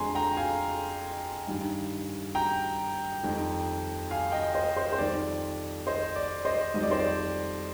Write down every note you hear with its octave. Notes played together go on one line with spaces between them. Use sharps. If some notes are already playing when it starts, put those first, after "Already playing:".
Already playing: F2 D3 G#3 G#5 A#5 C6
G5 A#5
F5 G#5
G2 D#3 G3
G5 A#5
F2 D#3 G3
F5 G#5
D#5 G5
C5 D#5
C5
C5
F2 D#3 G3 D5
C5 D#5
D5
C5 D#5
F2 D#3 G3 D#5
D5
C5
D5